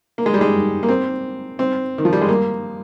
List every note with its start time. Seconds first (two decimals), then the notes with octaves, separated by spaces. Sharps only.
0.18 A#3
0.26 G#3
0.34 G3
0.41 G#3
0.83 A#3
0.89 C4
1.59 C4
1.98 D#3
2.05 F3
2.13 G3
2.22 G#3
2.29 A#3